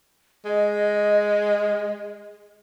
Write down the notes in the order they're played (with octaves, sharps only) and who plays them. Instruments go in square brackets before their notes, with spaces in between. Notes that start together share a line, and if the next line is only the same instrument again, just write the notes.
[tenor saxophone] G#3 [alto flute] D#5